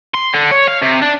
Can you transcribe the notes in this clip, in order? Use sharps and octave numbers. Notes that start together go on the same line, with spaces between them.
C6
D3
C#5
F5
C3
D4